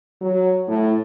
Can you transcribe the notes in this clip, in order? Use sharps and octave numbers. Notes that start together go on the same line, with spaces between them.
F#3
A2